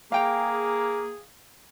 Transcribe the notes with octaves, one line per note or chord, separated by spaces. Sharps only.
A#3 G#4 F5 G5 A#5